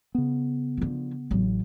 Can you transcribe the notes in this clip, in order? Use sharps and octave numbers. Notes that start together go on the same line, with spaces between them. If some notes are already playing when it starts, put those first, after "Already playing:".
C#3 B3
D3 F3
A1 F#3